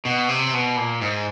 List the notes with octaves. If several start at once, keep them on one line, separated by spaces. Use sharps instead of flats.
B2
C3
B2
A#2
G#2